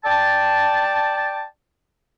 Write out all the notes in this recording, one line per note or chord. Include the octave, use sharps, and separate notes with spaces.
D5 G5 A5